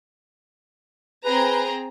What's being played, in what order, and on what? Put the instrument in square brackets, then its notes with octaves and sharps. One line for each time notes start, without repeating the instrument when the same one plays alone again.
[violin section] C4 G#4 A#5 [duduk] B4